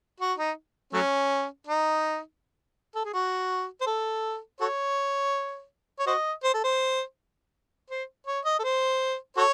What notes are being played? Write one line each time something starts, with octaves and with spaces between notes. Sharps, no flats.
F#4
D#4
F#3 A3 C#4
D#4
A4
G#4
F#4
C5
A4
F#4 A4 C#5
C#5
F#4 C5 D#5
C5
A4
C5
C5
C#5
D#5
A4
C5
F#4 A4 C#5